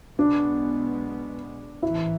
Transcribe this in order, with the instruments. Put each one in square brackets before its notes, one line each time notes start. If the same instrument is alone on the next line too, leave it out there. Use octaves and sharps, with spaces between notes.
[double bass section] B1 B2 G#3 B3 [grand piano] D4
[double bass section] A1 G#2 E3 [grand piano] E4